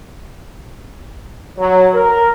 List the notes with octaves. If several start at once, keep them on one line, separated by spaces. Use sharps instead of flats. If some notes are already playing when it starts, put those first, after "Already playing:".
F#3
A#4